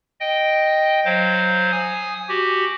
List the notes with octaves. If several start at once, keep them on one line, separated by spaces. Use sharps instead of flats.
D#5 G5
F#3 C5 F5
G#5 D#6
F#4 G4